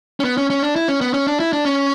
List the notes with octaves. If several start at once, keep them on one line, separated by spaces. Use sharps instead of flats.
C#4
B3
C#4
C#4
D4
E4
C#4
B3
C#4
D4
E4
D4
C#4